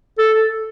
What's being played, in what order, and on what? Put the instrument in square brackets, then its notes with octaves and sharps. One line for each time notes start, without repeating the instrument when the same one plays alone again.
[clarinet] A4